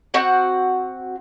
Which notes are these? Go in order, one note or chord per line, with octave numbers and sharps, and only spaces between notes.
C4 F#4 F#5